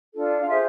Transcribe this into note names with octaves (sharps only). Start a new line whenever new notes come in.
D4 F4 A4
F5
F4 G#4 C5 E5